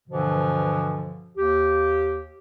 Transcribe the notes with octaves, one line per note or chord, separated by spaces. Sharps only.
G2 B2 D3 E3 F3
D#2 G4